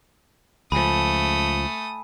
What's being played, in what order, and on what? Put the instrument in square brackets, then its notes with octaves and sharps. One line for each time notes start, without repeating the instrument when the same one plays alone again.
[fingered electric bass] C#2 F3 [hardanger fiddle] A3 D#6 [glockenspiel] G#5 B5